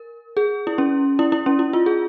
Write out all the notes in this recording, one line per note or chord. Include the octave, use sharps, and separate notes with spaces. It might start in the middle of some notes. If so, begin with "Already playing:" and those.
Already playing: A#4
G#4
E4
C#4
E4
E4
C#4
E4
F4
G#4